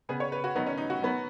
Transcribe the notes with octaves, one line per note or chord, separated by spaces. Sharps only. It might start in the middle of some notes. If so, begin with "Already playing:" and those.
C#3 B3 G#4
C#5
B4
F#4
D#3 F#3 B3 D#4
C#4
D#4
F#4
D#3 F#3 B3